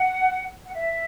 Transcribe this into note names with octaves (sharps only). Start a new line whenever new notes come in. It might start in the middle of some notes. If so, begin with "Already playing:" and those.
Already playing: F#5
F#5
E5